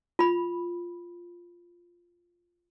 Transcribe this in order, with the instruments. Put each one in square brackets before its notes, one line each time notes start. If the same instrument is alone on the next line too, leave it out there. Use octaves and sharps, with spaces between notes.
[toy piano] F4 B5